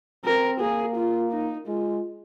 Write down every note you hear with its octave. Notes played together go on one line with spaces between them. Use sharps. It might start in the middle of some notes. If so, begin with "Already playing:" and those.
C4 A#4
A#3 G#4
F4
D#4
G#3 F4